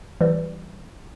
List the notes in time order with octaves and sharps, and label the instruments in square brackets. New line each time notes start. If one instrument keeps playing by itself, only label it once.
[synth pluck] E3 G3